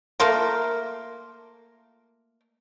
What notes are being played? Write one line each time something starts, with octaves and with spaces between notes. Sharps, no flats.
A3 A#3 F4 A#4